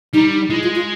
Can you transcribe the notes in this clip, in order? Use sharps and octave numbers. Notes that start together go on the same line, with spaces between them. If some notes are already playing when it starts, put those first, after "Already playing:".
G3 D#4
D#4
G#3 E4
F4
F4